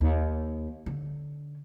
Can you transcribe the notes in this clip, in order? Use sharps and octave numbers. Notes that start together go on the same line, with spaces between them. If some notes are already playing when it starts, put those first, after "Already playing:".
D#2
D3